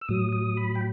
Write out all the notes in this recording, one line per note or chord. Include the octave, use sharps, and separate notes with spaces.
E6
A2 F#3 D#6
D#6
B5
G5